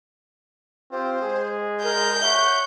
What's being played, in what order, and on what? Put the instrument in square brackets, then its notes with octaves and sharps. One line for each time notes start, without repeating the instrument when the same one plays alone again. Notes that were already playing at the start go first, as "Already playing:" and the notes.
[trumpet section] C4 F4 G4 [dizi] C5
[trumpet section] G#3 G#4
[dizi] A#4 [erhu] G6
[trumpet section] C#5 F#5 C#6 [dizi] E5